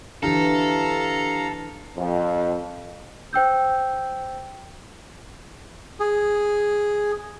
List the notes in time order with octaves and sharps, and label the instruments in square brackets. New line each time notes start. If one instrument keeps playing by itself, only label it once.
[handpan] D3 E3 [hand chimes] D4 E4 G4 [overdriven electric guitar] A4 [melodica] F5 A#5
[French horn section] F2
[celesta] C5 G5 E6 G6
[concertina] G#4